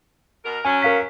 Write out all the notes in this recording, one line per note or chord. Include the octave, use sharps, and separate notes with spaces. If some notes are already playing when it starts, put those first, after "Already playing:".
B2 A#4
F#3 C#4 G#5
A#4 F5 B6